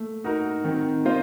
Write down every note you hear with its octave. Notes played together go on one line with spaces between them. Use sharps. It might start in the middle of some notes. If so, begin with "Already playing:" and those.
Already playing: A3 A#3
D#4 F#4 A#4
D#3 C4
A#3 F4 C5 D#5